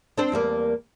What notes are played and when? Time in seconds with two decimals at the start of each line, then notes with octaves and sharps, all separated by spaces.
0.18 C4 D4 C5
0.32 E2 G3 A#3